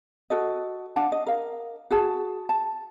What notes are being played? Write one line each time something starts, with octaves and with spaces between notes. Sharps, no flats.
F#4 A4 D#5
D4 F5 F#5 A5
D#5
A#4 F5
F#4 G#4 A5
A5